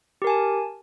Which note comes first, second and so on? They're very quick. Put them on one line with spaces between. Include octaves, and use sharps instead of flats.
G4 A#4 G#5 A5